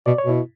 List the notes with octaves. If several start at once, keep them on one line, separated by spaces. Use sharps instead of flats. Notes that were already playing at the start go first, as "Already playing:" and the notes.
B2 D5
C#5
B2
E4